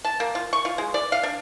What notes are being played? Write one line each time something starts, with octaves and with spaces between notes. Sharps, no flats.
A5
A#3
F4
C#6
F4
G#3
D5
F5
D4